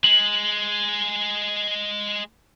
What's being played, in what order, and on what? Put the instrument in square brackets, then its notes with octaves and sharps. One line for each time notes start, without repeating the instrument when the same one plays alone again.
[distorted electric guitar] G#3 [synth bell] F#7